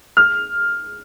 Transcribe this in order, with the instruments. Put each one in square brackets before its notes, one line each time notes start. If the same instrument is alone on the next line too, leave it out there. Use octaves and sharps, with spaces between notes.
[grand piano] F6